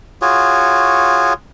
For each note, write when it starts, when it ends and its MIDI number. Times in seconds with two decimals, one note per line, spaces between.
0.22 1.33 65
0.22 1.33 66
0.22 1.33 68
0.22 1.33 73